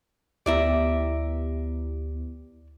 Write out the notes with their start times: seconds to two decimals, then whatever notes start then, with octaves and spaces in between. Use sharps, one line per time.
0.46 D2 B3 E4 G4 D5 E5 A#5